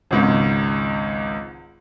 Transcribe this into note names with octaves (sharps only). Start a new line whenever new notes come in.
G#1 C#2 G#2